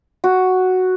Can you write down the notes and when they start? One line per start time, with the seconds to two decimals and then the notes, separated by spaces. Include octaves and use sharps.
0.24 F#4